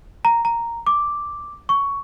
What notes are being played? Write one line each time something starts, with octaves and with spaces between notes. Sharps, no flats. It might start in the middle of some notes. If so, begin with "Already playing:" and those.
A#5
A#5
D6
C#6